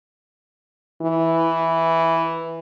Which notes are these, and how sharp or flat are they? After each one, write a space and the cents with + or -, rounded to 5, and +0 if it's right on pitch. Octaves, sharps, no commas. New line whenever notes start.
E3 +0